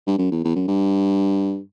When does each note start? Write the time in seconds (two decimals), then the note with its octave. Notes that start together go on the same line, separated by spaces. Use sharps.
0.07 G2
0.19 F#2
0.32 E2
0.44 E2
0.56 F#2
0.68 G2